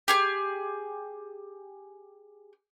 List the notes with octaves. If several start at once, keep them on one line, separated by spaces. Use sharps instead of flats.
G4 G#4 G#5